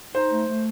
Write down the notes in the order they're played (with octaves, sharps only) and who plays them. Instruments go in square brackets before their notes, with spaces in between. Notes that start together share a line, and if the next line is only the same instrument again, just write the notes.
[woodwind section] D#4 [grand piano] C5
[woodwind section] A3
A3